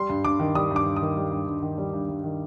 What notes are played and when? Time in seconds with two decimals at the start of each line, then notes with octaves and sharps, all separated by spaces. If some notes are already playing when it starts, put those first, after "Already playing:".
Already playing: G3 C6
0.10 G2
0.25 G2 D6
0.40 D#3
0.55 G3 D#6
0.71 G2 D6
0.86 G2
0.96 D#3 D#6
1.17 G3
1.32 G2
1.47 G2
1.63 D#3
1.78 G3
1.94 G2
2.09 G2
2.24 D#3